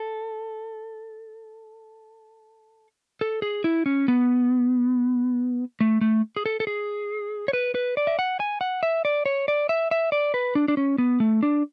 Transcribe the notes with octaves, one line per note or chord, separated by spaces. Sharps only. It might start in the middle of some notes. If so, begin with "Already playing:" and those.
Already playing: A4
A4
G#4
E4
C#4
B3
A3
A3
G#4
A4
A4
G#4
C#5
B4
B4
D5
E5
F#5
G#5
F#5
E5
D5
C#5
D5
E5
E5
D5
B4
D4
D4
C#4
B3
A3
D4